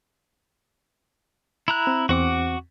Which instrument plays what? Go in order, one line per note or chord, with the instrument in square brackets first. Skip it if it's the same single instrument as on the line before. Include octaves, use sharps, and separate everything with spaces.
[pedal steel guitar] E4 A#5 F#6
[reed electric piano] C4
[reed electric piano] E2 C4 [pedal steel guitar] F#4 F#5 D6